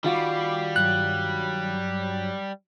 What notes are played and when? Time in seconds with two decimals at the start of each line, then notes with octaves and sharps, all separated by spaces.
0.04 D#3 G3 F4 F#4 B5 D6 C7
0.76 G2 F#3 F#6